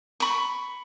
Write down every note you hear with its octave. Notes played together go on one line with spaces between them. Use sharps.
B5 C#6